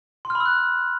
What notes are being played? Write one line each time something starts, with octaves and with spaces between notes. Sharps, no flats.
C6
F6
B5
E6
F#6